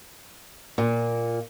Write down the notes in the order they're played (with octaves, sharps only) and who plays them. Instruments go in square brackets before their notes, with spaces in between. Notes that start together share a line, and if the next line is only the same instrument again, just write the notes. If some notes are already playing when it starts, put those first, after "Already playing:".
[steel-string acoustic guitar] A#2